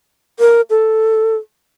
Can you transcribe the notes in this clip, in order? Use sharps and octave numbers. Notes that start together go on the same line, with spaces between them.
A#4
A4